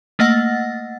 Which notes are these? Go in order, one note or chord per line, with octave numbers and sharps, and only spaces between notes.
A3 A#3 D#5 F#5 A6 A#6